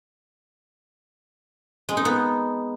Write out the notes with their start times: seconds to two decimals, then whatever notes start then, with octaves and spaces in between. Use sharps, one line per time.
1.89 G#3
1.97 D#4
2.05 B3